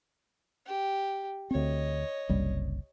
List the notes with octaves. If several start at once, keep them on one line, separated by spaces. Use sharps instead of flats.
G4
D2 C4 C#5 D#5
F#1 C2 G3